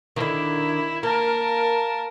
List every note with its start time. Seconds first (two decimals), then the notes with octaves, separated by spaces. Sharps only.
0.16 D3 D#3 E4
1.03 A#3 A#4 A5